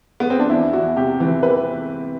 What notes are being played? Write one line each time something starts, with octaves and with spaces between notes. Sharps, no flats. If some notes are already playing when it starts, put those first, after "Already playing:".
B3
C4
D4
E2 E4
E2 F#4
C3 G4
E3
B4